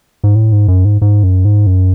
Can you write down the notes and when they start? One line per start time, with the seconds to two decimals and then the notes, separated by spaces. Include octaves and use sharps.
0.24 G#2
0.35 A2
0.52 G#2
0.68 F#2
0.85 G#2
1.02 G#2
1.23 F#2
1.45 G#2
1.67 F#2